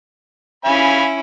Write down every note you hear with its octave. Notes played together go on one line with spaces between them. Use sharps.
C#4 E4 F5 G#5 B5